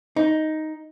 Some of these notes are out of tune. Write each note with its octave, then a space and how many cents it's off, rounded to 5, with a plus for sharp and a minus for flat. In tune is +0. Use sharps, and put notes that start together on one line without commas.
D#4 +5